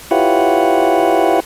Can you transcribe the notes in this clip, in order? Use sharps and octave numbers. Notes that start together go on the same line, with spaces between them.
E4 F4 G4 B4 C#5 F#5